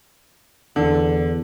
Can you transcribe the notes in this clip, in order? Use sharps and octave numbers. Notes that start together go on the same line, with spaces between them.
E2 D3